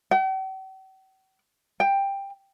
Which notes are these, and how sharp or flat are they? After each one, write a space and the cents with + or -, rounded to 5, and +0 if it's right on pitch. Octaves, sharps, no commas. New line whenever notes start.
G5 -45
G5 +10